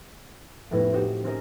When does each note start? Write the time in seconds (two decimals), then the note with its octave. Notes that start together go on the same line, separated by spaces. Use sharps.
0.71 F1 A2 B3 E4 B4 A#6
0.92 C4 D#4 F#4 G4
1.24 C4 C#4 F#4 G#4 A#4 D#5